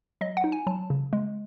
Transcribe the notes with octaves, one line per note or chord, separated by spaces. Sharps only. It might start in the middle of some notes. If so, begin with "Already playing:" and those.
F#3 D#5
F#5
D#4
G#5
F#3 A5
C#3
G#3